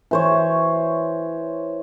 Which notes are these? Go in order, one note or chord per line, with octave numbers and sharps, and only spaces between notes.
E3 C5 C#5